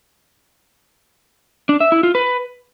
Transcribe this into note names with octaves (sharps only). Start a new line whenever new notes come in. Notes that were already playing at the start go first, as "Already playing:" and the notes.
D4
E5
E4
F4
B4